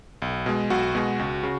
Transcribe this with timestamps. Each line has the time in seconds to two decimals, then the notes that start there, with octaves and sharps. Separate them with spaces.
0.22 B1
0.46 B2 G#3
0.70 B1 F#4
0.95 B2 G#3
1.19 C#2
1.43 C#3